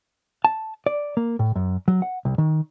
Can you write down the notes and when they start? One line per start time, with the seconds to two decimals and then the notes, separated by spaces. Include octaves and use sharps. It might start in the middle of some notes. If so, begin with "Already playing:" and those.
0.45 A5
0.86 D5
1.17 A#3
1.39 A2
1.56 F#2
1.88 F#3
2.02 F#5
2.25 C2
2.38 D#3